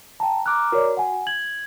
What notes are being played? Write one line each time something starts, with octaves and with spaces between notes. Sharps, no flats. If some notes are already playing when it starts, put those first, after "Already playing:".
G5 A5 A#5
A#5 D6 F6 F#6
F#4 A#4 C#5 D5
F#5 G#5
G#6 F#7